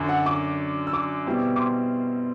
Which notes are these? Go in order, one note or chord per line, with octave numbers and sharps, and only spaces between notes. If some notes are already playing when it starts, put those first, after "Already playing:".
Already playing: F#2 D3 F#3
F#5
D6
E6
D6
B2 G3 C4 E4
D6
C6